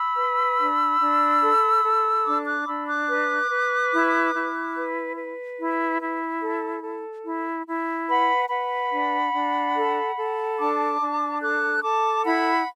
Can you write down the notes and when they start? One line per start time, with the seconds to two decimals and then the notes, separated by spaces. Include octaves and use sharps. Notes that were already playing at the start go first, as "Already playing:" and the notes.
Already playing: B5 E6
0.16 B4
0.59 D4
1.00 D4
1.42 A4
1.83 A4
2.25 D4 A5 D6
2.46 D6 F#6
2.66 D4 B5 E6
2.87 D6 F#6
3.09 B4
3.51 B4
3.92 E4
4.33 E4
4.75 B4
5.16 B4
5.58 E4
6.00 E4
6.41 A4
6.83 A4
7.24 E4
7.67 E4
8.08 B4 F#5 B5
8.49 B4 F#5 B5
8.91 D4
9.33 D4
9.75 A4
10.16 A4
10.58 D4 A5 D6
10.99 D4
11.41 A4 D6 F#6
11.78 E6
11.82 A4 A5 D6
12.24 E4 F#5 B5